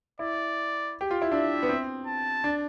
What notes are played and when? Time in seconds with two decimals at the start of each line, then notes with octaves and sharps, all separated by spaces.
0.19 E4 D5
1.01 G4
1.11 F4
1.22 E4
1.31 D4 E5
1.63 B3
1.69 C4
2.07 A5
2.44 D4